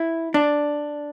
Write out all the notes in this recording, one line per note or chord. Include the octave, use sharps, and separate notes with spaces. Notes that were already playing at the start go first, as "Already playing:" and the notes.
Already playing: E4
D4